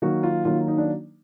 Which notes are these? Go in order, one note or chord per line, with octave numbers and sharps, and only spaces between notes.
D#3 F#3 A#3 F#4
F4
D#3 F#3 A#3 F4
D#4
D4